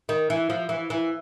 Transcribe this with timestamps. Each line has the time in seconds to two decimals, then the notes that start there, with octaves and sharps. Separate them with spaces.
0.09 D#3
0.30 E3
0.50 F3
0.69 E3
0.90 E3